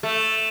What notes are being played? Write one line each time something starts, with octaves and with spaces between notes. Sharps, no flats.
A3